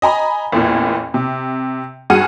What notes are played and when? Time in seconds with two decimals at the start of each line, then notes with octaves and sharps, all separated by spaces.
0.02 D#5 G#5 A#5 B5
0.52 A1 E2 A#2
1.14 C3
2.10 G2 F#4 G#4 F#5 F6 D#7